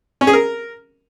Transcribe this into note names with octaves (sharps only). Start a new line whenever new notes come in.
C#4
G#4
A#4